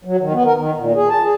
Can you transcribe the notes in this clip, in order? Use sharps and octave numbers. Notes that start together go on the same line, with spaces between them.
F#3
D#3
B3
A#4
D#3
A#2
G#4
A5
G#4